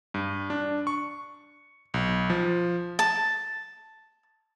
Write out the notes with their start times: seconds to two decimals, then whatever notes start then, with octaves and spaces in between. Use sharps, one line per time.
0.14 G2
0.50 D4
0.87 C#6
1.94 B1
2.30 F3
2.99 A5